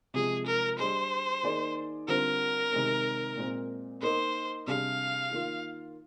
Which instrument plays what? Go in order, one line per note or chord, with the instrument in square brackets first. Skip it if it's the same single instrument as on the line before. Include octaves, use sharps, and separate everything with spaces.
[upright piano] C3 F3 G#3 [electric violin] G#4
[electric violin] A#4
[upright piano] G3 D4 G#4 D#5 [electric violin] C5
[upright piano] D#3 A#3 D#4 G#4 D5
[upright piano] D3 G3 C4 F4 C5 [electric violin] A#4
[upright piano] C3 D#3 G#3 C4
A#2 G#3 C4
[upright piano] A#3 D#4 A#4 D#5 [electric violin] C5
[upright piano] C3 G3 D4 G#4 [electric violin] F5
[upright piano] D#3 A#3 F4